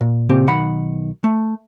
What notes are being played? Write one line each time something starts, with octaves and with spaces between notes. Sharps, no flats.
A#2
A#2 C#3 C4 G4
B1 D#3 F#5 B5
A3